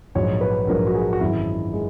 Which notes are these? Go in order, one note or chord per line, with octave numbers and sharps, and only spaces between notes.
A#1 G#2 F#3 C#5
B4
A#1 G#2 F#3 A#4
F#4
G#4
F#4
G#1 F#2 E3 G#3 E4
G#3